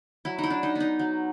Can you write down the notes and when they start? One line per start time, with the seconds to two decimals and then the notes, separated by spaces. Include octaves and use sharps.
0.25 F#3 E4
0.38 D#4 E4
0.50 D4
0.63 D#4
0.75 B3 D#4
0.99 F#3